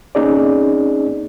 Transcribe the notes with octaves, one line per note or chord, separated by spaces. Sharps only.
A#3 C4 C#4 D#4 G#4 D5